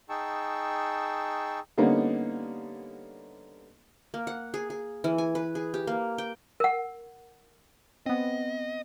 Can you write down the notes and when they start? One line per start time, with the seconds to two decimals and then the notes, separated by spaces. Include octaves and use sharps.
0.09 D#4 G#4 G5 A5 C#6 E6
1.78 D3 G3 A#3 B3 C#4 D#4
4.14 A#3
4.27 F#5
4.54 G#4
4.70 G#4
5.04 E3
5.18 G#5
5.35 B4
5.55 G#4
5.74 G4
5.87 A#3
6.18 G5
6.60 A#4 F#5
8.06 B3 C4 D#5